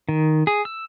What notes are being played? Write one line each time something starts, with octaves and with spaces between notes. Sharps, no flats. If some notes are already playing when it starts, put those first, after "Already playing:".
D#3
G#4
E6